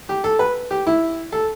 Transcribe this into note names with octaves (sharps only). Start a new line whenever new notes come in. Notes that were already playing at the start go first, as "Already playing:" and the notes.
G4
A4
B4
G4
E4
A4